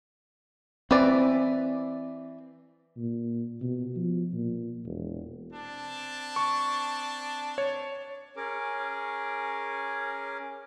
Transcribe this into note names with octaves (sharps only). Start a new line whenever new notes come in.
E3 C4 B4 D5
A#2
B2
F3
A#2
E1
C4 D4 A5
C#6
C#5
C#4 G#4 A#4 D6